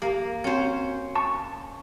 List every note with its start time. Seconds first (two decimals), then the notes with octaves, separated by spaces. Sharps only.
0.02 A#3 G4
0.44 C4 C#4 F#4 C5
1.16 A5 C#6